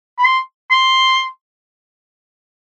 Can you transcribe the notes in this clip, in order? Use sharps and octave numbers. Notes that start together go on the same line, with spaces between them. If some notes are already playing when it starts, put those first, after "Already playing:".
B5
C6
C6